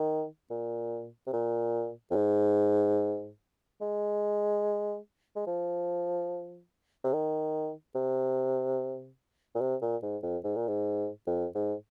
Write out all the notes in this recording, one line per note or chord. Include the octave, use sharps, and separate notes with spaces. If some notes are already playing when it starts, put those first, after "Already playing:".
Already playing: D#3
A#2
C3
A#2
F2
G#2
G#3
G#3
F3
C3
D#3
C3
A#2
C3
A#2
G#2
F2
G#2
A#2
G#2
F2
G#2